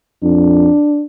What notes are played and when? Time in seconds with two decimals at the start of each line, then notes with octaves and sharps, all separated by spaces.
0.23 F2 D4